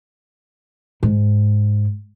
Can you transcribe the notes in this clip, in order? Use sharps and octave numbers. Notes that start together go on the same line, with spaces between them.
G#2